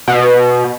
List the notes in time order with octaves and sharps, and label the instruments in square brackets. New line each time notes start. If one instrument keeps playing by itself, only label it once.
[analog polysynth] B2